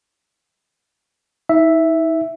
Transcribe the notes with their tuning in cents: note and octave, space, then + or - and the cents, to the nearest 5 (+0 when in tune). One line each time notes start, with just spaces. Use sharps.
D#4 +45 E5 +0